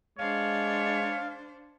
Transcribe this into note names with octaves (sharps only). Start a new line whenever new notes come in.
G#3 D4 C5 C#5 F5